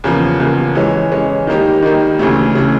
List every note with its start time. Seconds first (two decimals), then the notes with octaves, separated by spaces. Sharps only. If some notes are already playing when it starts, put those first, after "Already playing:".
0.04 E2 C#3 F3 A#3
0.40 E2 C#3 F3 A#3
0.75 E3 G#3 C#4
1.12 E3 G#3 C#4
1.47 D#3 G3 A#3 D#4 G4
1.83 D#3 G3 A#3 D#4 G4
2.19 D2 C#3 E3 A3
2.55 C#3 E3 A3